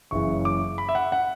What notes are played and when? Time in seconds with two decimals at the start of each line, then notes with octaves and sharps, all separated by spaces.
0.11 F#1 F#2 C#3 E3 C#6
0.45 D6
0.78 B5
0.89 E5
0.95 F#5
1.12 F#5